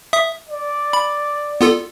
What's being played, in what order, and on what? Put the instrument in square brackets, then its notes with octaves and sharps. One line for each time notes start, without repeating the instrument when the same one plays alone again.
[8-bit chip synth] E5 D#6
[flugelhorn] D5
[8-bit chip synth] B5
B3 F4 A4